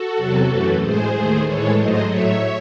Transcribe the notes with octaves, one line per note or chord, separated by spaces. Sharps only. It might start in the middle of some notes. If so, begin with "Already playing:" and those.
Already playing: F#4 A4
E2 C3 F#3
F#2 E3 A3
A2 G#3 G#4 C5
D#2 D#3 A3
A2 E3 G#3 A4 C#5
G#2 F#3 A3 C5 D#5
A2 F#3 A3 C#5 E5